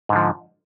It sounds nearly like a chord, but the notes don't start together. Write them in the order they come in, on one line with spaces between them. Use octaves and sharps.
G#2 D3 F3